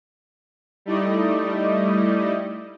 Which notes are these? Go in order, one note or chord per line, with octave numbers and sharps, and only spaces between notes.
G3 A3 D#4 E4 D5 D#5